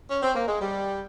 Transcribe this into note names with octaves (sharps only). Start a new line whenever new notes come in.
C#4
C4
A#3
G#3
G3